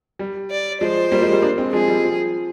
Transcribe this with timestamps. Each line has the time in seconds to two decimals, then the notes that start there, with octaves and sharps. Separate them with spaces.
0.19 G3
0.51 D5
0.81 F3 G#3 C5
1.11 G3 A#3
1.21 F3 G#3
1.32 G3 A#3
1.42 A#3 D4
1.58 G#3 C4
1.73 F3 G#3 G#4
1.88 G3
2.04 F3